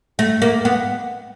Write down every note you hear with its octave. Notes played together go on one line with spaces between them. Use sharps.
A3
A#3
B3